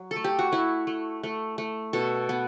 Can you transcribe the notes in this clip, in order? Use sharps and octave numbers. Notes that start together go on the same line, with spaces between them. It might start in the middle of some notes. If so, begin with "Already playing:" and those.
Already playing: F#3
A4
A3
G4
F#4
A3 E4
A3
A3
A3
B2 A4
B3